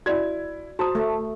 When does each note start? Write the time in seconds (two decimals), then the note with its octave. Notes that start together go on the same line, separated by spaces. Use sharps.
0.06 E4 F#4 D5 G#6
0.79 F#4 C5 A5 A#5 D#6
0.95 A3